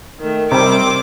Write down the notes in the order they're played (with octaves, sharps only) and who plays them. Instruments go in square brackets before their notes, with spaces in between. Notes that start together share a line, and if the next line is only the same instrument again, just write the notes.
[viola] D#3 A3
[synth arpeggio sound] C3 G3 [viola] D#3 C4 [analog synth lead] C5 [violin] D6